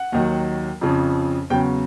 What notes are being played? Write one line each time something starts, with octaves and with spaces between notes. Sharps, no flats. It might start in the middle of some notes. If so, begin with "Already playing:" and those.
Already playing: F#5
D#2 D#3 F#3
F2 C#3 F3
E2 C#3 F#3 G5